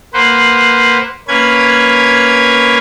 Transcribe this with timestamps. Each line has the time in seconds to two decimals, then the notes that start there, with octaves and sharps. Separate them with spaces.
0.14 A#3 B4 C5 F#5
1.28 A#3 C#4 B4 G#6